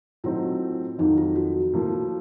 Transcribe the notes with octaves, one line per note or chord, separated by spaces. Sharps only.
A2 F#3 C4 D#4 F4
F2 D#3 F#3 D#4
F4
F#4
A2 F3 A#3